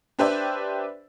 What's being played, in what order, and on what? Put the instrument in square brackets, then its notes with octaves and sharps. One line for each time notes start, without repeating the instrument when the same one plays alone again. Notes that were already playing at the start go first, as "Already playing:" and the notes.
[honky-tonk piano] D4 G4 B4 C5 D5 E5